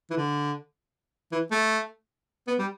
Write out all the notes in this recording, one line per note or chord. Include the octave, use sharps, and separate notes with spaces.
E3
D3
E3
A3
B3
G3